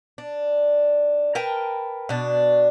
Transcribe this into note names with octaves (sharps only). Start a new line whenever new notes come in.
D4
A#4 B4 G5 A5
B2 D4